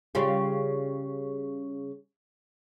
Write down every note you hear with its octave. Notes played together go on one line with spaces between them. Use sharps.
C#3 G3 F4